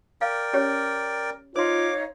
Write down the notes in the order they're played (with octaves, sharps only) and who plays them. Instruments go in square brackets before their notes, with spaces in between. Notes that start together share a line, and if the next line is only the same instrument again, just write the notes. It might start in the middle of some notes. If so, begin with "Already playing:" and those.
[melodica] A#4 D5 G5 [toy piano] F5
[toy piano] C#4 G4 C#5
[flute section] D#4 C#5 F5 [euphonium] F4 [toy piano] C5 C6 [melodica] D6